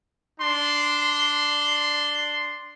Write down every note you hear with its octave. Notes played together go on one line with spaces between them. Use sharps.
D4 C6